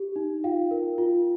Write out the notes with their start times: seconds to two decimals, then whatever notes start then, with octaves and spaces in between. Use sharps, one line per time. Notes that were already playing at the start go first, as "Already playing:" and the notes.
Already playing: G4
0.16 D#4
0.44 F4 F5 G5
0.71 A#4
0.98 F4